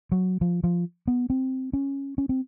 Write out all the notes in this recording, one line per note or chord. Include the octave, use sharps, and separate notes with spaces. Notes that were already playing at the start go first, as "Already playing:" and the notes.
F#3
F3
F3
B3
C4
C#4
C#4
C4